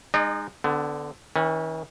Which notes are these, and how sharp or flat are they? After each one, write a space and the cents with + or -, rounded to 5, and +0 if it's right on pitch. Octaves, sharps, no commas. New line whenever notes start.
G#3 -25 D#4 -25 D5 +45
D3 +0 B3 +30
E3 -45 C#4 +0